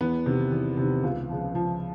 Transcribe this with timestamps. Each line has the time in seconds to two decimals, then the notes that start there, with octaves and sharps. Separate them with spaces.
0.01 E2 B3
0.26 C3 D#3
0.52 E2
0.77 C3 D#3
1.04 C#2
1.29 C#3 F3
1.55 C#2 F3